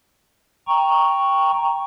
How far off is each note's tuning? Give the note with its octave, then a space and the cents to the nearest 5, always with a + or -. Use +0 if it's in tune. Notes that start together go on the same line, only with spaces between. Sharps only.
G5 +5 A#5 +0 C#6 +0